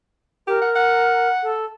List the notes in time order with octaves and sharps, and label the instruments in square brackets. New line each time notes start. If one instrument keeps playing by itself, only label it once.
[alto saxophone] G4 [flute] A#4
[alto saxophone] F#5
F#5
[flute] A4